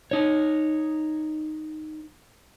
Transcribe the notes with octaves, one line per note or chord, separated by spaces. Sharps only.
D#4 C#5